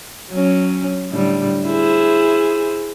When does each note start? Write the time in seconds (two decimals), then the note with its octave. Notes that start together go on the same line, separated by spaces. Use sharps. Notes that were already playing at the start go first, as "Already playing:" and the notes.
0.31 F#3 C#4
1.11 A2 D3 G3
1.66 E4 G#4 C5